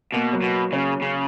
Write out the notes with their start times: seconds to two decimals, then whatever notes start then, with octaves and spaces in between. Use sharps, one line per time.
0.14 B2 A#3
0.33 F#3
0.42 B2
0.72 C#3 C#4
1.02 C#3